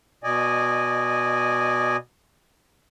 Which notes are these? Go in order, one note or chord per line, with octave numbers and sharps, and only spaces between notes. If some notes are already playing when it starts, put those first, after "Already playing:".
B2 D5 D#5 G#5